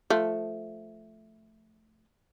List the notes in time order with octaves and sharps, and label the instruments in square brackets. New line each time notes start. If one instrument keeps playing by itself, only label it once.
[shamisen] F3 A3